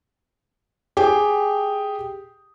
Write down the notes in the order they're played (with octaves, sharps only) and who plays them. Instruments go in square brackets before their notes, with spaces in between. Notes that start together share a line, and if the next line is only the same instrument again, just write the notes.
[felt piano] G4 G#4 G5